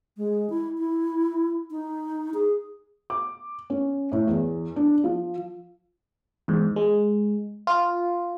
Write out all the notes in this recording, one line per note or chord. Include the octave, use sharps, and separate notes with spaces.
G#3
E4
E4
D#4
G#4
D6
C#4
A2
E2
D4
F3
E2 G#2
G#3
F4